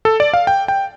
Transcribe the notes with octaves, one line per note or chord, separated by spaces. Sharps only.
A4
D5
F5
G5
G5